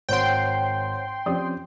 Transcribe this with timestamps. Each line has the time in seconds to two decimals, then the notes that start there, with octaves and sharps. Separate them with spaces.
0.09 G#1 C5 C#5 F#5 G5 C6
1.26 F3 C4 C#4 G4 D5 D#6